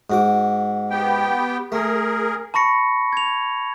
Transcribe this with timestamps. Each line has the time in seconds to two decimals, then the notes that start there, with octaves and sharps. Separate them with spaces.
0.10 G#2 F#4 D6
0.90 B3 G4 G5
1.72 A3 G#4 A#4
2.54 A5 B5 C#6 A#6 C#7
3.13 G#6 F7